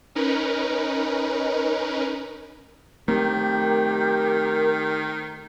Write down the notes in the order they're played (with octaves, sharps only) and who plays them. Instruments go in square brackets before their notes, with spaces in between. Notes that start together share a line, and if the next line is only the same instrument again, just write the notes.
[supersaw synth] C#4 D#4 A#4 B4
[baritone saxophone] D#3 [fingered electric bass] A3 C4 [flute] G4 [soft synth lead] A#4